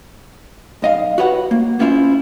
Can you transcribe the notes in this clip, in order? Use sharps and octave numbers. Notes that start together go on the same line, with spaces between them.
B1 D#5 F5
F#4 G4 B4 C#5 E5 F#5
A#3
A#3 B3 C#4 E4 F4 C5